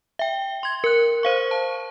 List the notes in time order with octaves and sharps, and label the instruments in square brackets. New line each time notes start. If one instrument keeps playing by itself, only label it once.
[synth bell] E5 G5
C6 G#6
A#4 F#6
C5 F5 C#6
A5